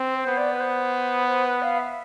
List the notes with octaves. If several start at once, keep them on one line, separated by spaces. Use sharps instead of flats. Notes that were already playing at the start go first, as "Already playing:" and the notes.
Already playing: C4
C5
B3
D5
B4
C5
C5
B4
F5
E5